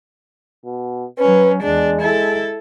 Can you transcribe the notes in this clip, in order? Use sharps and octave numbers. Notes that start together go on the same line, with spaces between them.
B2
F#3 C#4 B4
E2 G#3 D4
E4 A4